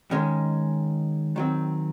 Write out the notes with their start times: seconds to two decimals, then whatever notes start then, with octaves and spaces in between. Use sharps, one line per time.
0.11 D#3 G#3 C#4
1.36 D#3 F#3 C4